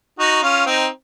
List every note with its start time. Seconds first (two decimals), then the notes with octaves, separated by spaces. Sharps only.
0.19 D#4 F#4
0.42 C#4 F4
0.66 C4 D#4